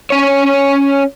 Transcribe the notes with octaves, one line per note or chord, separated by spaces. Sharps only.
C#4 C#5